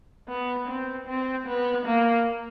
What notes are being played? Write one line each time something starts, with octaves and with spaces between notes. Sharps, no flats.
B3
C4
C4
B3
A#3